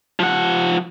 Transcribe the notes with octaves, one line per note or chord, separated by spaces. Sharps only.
F3 F#5